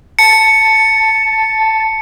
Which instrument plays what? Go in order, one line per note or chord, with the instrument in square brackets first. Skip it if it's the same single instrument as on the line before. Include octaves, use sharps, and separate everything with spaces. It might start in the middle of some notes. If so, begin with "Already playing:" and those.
[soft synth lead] A5 [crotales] C#7